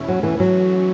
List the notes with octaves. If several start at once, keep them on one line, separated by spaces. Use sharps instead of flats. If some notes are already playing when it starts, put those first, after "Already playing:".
Already playing: E2 B2 A3 C#4 E4
F#3
E3
G#2 E3 F#3 A3 C#4 F#4